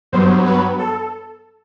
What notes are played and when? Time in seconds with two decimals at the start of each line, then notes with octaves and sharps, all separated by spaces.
0.12 G2 F#3 B3 C5
0.46 B4
0.79 A4